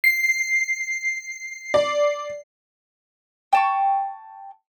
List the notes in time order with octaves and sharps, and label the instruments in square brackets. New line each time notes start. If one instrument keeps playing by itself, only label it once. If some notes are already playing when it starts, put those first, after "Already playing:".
[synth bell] C7
[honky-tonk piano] D5
[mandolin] G5 A5 C#6